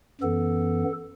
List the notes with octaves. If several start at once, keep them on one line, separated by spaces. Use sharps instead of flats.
F#2 E3 B3 A4